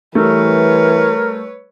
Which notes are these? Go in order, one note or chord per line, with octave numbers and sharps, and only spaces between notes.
E3 G3 A3 A#4 B4 C#5